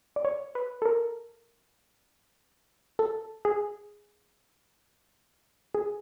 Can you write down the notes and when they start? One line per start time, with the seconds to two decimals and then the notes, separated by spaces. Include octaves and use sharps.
0.16 D5
0.25 C#5
0.55 B4
0.82 A4
0.85 A#4
2.99 A4
3.45 G#4
5.75 G#4